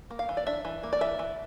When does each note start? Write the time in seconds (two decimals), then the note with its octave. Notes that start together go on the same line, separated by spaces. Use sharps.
0.11 A#3
0.19 F5
0.29 E3
0.37 D5
0.47 D4 E5
0.65 E3
0.83 A#3
0.93 D5
1.01 E3 E5
1.19 E3